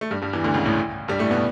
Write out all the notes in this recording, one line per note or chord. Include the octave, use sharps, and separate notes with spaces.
A3
G2 G3
G2 G3
E2 E3
D2 D3
C#2 C#3
A1 A2
G2 G3
A2 A3
B2 B3